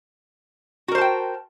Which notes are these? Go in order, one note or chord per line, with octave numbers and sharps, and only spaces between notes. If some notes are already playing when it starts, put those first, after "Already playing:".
F#4 A#4 C5 G5 A5